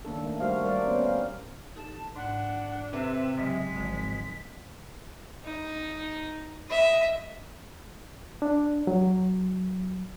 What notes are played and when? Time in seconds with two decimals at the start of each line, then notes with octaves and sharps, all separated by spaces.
0.05 D#3 A#3 D4 A4
0.22 A3 A#3
0.40 G3 A#3 F#4 G4 C5 F5
0.64 G3 A#4 D5 F5
0.86 B3 C#4 C5
1.05 F5
1.76 D#4 G4 A4 A5
2.16 G#2 D4 F#5
2.93 C3 A4 B4 E5
3.37 C#3 F#3 G#3 C4 B6
3.76 G#1 D3 F3
5.44 D#4
6.70 D#5 E5
8.42 D4
8.87 F#3